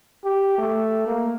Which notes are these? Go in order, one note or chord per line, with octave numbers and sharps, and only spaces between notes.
G4
A3
A#3